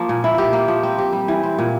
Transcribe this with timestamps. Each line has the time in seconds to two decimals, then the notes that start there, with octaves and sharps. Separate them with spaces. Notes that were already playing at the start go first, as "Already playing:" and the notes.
Already playing: F3 A#3
0.09 A#2
0.24 E4
0.38 G4
0.53 A#3
0.68 F3
0.83 C4
0.98 G4
1.13 G3
1.28 E3
1.43 C4
1.58 A#2